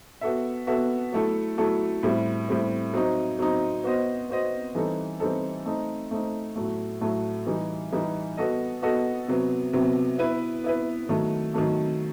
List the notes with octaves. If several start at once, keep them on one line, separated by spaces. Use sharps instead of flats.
B3 F#4 A4 E5
B3 F#4 A4 E5
F#3 A3 E4 A4
F#3 A3 E4 A4
A2 G3 C4
A2 G3 C4
F#3 C4 D#4
F#3 C4 D#4
B3 F#4 C5 D#5
B3 F#4 C5 D#5
E3 G3 C4 D#4 A4
E3 G3 C4 D#4 A4
A3 C4 D#4
A3 C4 D#4
A2 F#3 A3
A2 F#3 A3
E3 G3 D#4
E3 G3 D#4
B3 F#4 A4 D#5
B3 F#4 A4 D#5
C3 F#3 B3
C3 F#3 B3
B3 E4 B4
B3 E4 B4
D#3 F#3 A3
D#3 F#3 A3